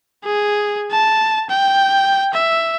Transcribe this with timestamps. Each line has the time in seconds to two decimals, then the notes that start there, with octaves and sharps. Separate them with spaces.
0.24 G#4
0.91 A5
1.50 G5
2.34 E5